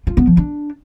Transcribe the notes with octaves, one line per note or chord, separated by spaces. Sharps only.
F4
B3
F3
D4